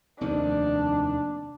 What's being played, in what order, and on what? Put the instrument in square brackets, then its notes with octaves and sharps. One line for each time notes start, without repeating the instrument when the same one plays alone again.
[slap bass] F1 D#2 D#3 [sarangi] D4